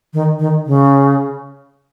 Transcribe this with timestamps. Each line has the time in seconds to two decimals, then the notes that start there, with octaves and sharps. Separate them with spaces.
0.13 D#3
0.39 D#3
0.66 C#3